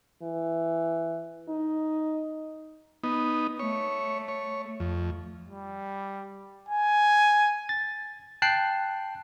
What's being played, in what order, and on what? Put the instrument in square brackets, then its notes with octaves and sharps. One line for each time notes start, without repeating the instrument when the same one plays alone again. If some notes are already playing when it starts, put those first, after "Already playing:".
[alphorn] E3
D#4
[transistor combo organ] B3 D#4
[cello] A3 [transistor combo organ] C#5
[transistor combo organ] C#5
F2
[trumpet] G3
G#5
[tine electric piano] A6
G5 A5 F#6 C7